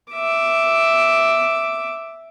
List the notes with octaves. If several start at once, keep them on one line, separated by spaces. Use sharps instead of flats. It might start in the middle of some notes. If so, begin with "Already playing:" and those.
E5 D6